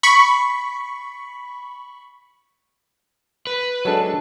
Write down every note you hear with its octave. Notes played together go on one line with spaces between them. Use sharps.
B5 C#6
B4
F#3 G#3 D4 A4